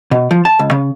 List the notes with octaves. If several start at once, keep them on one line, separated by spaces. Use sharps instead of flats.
B2
F3
A5
C#2
C#3